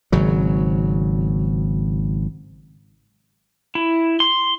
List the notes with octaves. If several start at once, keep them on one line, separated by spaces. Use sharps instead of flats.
G#1 C#3 F#3
E4
C6